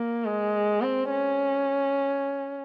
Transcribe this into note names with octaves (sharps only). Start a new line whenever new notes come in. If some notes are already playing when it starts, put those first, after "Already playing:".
Already playing: A#3
G#3
C4
C#4